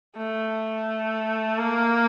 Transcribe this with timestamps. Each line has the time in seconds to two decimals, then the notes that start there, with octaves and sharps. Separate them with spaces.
0.17 A3
1.59 A#3